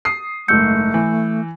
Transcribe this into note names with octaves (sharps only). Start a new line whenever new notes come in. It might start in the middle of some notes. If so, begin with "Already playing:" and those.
D#6 C7
F#1 G#2 A3 E6 G6 C#7
E3